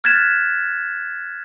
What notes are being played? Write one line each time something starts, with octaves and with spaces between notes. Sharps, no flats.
F6 F#6 G#6 A6 B6 E7